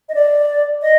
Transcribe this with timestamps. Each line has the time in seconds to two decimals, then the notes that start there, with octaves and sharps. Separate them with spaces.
0.09 D#5
0.14 D5
0.82 D#5